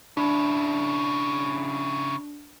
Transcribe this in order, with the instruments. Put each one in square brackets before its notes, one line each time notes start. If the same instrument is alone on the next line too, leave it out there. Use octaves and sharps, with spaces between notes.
[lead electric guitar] C#3 E4 [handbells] D4